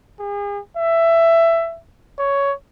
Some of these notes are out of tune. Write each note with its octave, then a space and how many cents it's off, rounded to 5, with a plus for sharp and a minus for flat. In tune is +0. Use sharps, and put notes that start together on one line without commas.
G#4 -40
E5 +15
C#5 +10